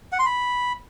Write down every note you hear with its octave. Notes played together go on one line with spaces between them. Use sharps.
F#5
C6
B5